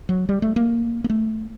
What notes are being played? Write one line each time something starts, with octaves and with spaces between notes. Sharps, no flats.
F#3
G3
A3
A#3
A#3
A3